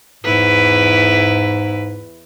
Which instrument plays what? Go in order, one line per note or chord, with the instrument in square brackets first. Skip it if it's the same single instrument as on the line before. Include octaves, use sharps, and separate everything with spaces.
[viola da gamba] E2 E4 B4 [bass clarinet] G#2